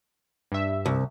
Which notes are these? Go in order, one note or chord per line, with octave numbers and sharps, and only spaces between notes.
G2 E5
C2